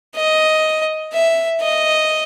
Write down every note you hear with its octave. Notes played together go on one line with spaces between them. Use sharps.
D#5
E5
D#5